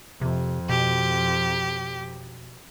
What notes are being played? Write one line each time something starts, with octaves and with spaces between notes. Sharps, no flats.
F2 C3
B2 G4